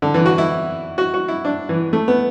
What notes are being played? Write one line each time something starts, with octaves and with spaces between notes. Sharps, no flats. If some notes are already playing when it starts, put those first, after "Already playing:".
D3
E3
F#4
E4
F#4
F#4
E4
D4
E3
A3
B3